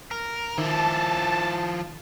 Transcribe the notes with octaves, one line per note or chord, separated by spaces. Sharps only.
A#4
D#3 F3 E4 A5